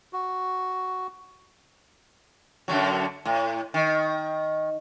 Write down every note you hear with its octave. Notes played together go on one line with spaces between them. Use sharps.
F#4
F#2 D3 F#3
A2
D#3